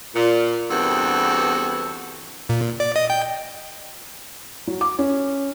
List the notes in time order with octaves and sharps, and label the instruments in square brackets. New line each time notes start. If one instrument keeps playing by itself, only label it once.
[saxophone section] A#2
E2 G2 B3 C4 F#4 A4
[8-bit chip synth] A#2
D5
D#5
G5
[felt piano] F#3
D6
C#4